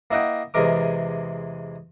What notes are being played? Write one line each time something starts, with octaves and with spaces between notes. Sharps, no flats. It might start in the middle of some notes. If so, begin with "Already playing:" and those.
A#3 E4 D#5 F#5 G5
E2 C3 E3 G#3 A#4 D6